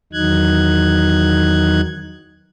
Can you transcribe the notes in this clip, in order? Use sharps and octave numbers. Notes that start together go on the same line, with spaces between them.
E2 D#3 F#3 D#4 F#6 G#6